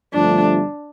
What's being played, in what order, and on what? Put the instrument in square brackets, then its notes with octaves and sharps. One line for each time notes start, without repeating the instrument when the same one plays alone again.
[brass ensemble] G1 G2 F3 A3 [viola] D4